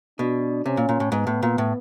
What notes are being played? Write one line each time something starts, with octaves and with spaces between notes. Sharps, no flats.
B2 D4
C3 C#4
A#2
A#2
A2
G#2 B3
A2
A#2
A2